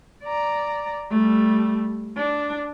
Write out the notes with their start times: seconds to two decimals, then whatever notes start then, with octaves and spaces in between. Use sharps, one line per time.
0.24 D5 A#5
1.11 G3 A3
2.17 D4